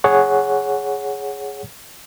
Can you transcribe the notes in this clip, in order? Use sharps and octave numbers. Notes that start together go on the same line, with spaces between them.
G#4 C#5 F#5